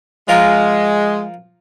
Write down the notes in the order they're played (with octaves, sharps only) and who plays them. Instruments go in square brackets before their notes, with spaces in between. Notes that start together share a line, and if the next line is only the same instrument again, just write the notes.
[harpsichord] F3 F4 A#4 [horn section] G#3